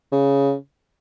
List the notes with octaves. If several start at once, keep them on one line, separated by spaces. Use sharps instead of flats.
C#3